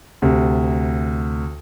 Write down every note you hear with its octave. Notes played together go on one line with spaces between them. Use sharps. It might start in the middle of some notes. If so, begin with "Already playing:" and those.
D2 C3